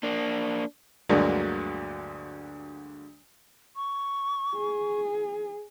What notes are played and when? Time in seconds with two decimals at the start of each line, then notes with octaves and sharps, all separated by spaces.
0.03 A#3 D4
1.09 D2 G2 D3 F#3 G#3 A#3
3.76 C#6
4.56 G#4